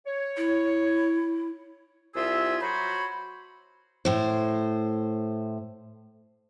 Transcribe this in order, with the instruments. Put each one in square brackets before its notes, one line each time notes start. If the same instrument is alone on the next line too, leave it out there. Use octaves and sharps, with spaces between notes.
[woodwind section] C#5
[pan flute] E4
[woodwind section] C2 F4 G#4 E5 E6
F#3 F#4 C5 C#5 B5
[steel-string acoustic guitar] A2 C5